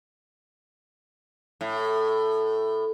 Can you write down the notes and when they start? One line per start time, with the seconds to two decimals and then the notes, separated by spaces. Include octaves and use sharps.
1.61 A2